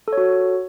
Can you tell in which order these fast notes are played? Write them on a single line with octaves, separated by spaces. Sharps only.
A4 C#5 F#4